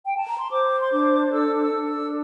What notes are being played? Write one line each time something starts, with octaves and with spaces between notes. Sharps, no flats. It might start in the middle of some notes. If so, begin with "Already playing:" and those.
G5
A5
A#5
C6
C5 D6
C6
D4 D6
A4 E6
E6
D4
E6